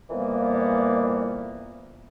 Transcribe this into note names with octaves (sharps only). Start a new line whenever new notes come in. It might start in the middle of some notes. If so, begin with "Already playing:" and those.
F2 A#2 E3 G3 A#3 B3